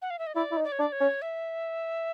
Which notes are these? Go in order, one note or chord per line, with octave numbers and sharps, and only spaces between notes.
F#5
F5
E5
D#5
E4 D5
E4
D#4
D5
C#5
D4 D5
C#5
C#4
E5